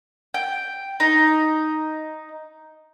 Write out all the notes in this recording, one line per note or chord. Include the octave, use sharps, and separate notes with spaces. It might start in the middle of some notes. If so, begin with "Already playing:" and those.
G5
D#4